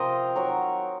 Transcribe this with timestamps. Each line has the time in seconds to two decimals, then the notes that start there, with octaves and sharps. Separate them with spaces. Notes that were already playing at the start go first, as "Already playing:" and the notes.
Already playing: C3 F3 C4 A#4 C5 D#5
0.35 D#3 F#3 C4 A#4 C#5